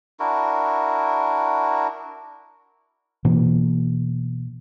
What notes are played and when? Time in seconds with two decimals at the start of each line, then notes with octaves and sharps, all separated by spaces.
0.20 D4 E4 F#4 A#4
3.25 B2 E3 A#3